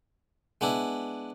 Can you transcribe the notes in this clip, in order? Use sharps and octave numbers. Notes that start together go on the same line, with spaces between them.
G#3 B3 D4 E4